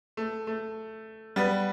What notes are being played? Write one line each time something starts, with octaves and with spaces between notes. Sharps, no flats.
A3
A3
G3 B3